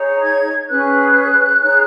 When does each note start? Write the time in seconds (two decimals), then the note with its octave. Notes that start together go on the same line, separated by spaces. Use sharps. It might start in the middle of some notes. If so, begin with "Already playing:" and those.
Already playing: D#4 G#4 C#5
0.21 G#6
0.68 C#4 G#4 B4 F#6
1.61 D#4 G#4 C#5